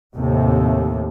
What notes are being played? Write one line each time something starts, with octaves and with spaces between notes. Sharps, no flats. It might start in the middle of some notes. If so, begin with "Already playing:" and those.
D#2 A2 C3